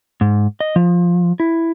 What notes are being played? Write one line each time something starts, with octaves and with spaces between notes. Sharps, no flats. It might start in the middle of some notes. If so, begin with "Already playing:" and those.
G#2
D#5
F3
E4